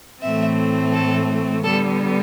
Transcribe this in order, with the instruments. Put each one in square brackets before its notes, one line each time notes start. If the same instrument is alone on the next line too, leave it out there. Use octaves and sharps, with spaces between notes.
[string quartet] A2 E3 A3 C4 E5
A4
D3 G3 B3 A4